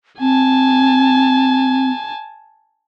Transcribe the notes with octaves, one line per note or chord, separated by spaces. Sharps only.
C4 G#5 A5